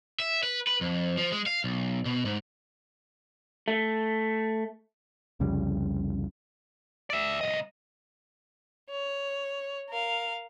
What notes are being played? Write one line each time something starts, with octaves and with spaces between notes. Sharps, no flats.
E5
B4
B4
F2
F3
G#3
F5
B1
B2
G#2
A3
C2 F2 C#3 G3
D5 E5
C2 D#5
C#5
A#4 F5